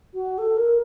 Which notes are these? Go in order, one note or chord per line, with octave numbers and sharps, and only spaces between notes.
F#4
A4
A#4